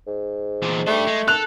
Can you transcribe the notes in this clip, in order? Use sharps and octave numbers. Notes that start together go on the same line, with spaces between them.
G#2
E2 A#2
A3 D4 G4
G#3
A4 F#6 F7